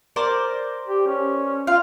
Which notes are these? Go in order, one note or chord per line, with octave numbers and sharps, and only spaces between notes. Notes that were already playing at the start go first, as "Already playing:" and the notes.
A#4 C5 D5
G4
C#4
F4 F5